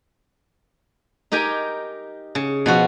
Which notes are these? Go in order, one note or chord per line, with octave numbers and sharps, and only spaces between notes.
D#4 G4 A#4 G5 G#5
C#3
B2 F3 F#4